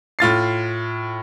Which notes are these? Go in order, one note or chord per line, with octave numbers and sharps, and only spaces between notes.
A2 F4 A6 C7